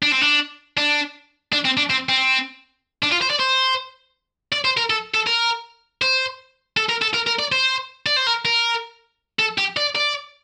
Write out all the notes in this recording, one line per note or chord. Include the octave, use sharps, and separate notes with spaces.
D4
C4
D4
D4
D4
C4
D4
C4
C4
D4
F4
C5
D5
C5
D5
C5
A#4
A4
A4
A#4
C5
A4
A#4
A4
A#4
A#4
D5
C5
D5
C5
A#4
A#4
A4
G4
D5
D5